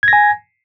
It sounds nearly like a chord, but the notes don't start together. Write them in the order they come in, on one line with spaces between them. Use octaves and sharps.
G#6 A#6 G#5